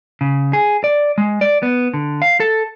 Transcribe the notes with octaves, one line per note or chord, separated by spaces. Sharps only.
C#3
G#4
D5
G#3
D5
B3
D3
F5
A4